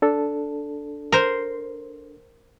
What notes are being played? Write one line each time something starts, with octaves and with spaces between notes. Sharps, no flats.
D4 A4
A#4 C5